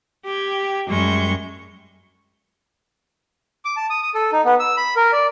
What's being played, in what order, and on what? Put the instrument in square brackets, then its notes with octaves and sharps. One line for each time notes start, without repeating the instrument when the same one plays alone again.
[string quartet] G4 G5 G#6
F#2 G3 G#3 C#6 G6
[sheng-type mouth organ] D6
A5
D#6
D#6
A4
D#4
B3
E6
B5
A#4
D5